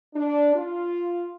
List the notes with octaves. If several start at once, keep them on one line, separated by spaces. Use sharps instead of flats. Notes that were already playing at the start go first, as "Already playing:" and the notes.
D4
F4